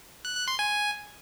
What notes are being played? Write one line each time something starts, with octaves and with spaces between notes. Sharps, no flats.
F#6
F#6
C6
G#5